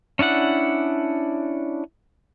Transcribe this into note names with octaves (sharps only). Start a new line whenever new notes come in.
C#4 D4 E4 F#5